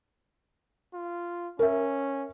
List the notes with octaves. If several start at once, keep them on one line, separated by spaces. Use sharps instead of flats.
F4
C#4 A#4 E5